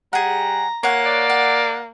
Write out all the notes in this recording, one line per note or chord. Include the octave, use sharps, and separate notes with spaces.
G3 G#4 F#5 A#5
A#3 C#5 F#5
D5
F#5